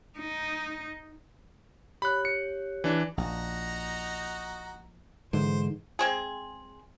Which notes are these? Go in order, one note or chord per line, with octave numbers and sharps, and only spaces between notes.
D#4
G4 C#5 B5 F#6
C#7
E3 D4
A#1 D#4 F#4 A#5
G#2 D3 E3 C5
G#3 C4 G#4